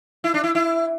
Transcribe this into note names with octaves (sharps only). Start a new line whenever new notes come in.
E4
D4
E4
E4